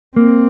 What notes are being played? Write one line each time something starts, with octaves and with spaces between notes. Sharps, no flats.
A#3 C4